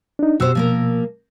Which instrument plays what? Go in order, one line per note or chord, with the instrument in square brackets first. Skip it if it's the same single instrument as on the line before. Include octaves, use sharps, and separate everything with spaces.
[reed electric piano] D4 D#4
[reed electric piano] B2 E6 [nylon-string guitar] F#4 G4 C5
[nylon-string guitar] F3 A#3 A#4